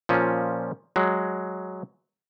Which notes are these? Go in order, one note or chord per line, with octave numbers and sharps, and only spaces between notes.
A#2 F3 C#4
F#3 G#3